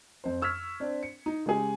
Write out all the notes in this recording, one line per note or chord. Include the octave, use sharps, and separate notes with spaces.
F2 C5
C#6 E6 F6 G#6 B6
C4 D4
C#7
D#4
C#3 G#3 G4 G#4 G#5